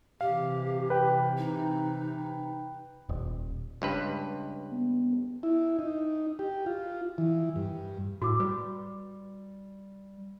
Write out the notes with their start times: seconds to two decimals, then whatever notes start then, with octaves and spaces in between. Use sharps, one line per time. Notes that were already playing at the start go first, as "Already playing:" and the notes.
0.21 C3 E3 G4 F5
0.90 B4 G5
1.38 D#4
3.09 D#1
3.82 C#2 G2 B4
4.72 B3
5.43 E4
5.79 D#4
6.39 G4
6.66 F4
7.18 E3
7.56 G2
8.22 A2 F#4 D6 E6
8.40 G3 B4